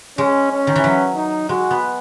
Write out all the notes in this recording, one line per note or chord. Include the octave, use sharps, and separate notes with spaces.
G#3 C#4
C#4
D#3
E3
F#3
D#4
G#3 F#4
B3